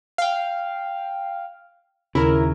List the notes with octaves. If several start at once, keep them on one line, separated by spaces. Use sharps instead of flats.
F5 G5
D#1 D#2 C#3 E4 A#4